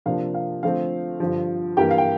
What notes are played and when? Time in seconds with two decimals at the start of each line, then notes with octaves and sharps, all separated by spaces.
0.06 C3 F3 A#3 D4 F5
0.34 F5
0.63 D3 F3 A3 C4 F5
1.20 G2 D3 F3
1.77 G2 E3 A#3 G4 G5
1.91 F5
1.98 G5